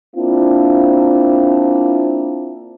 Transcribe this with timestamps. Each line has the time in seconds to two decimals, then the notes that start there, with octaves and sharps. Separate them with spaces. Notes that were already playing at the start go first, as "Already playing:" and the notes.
0.15 A#3 C4 D4 E4 F4